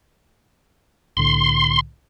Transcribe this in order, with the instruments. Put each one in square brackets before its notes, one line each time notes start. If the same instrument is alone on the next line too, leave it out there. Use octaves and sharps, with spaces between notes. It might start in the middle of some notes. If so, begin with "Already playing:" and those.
[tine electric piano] C2 A2 D3 [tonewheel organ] C6